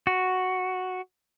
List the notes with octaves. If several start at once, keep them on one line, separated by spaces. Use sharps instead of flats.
F#4